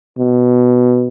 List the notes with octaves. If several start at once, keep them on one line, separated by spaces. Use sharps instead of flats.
B2